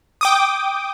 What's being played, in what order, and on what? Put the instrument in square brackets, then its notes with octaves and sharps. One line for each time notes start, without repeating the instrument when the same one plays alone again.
[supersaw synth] G5 D6 D#6